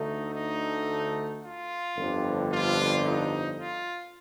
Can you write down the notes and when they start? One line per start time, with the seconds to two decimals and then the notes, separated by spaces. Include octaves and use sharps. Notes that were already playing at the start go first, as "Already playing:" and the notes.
Already playing: D2 D3 A3 D#4
0.34 D#4
1.42 F4
1.96 G1 F2 D3 G3 C4
2.50 F4
3.04 D#4
3.58 F4